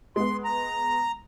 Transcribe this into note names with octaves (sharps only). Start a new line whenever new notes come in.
G#3 B3 C6
A#5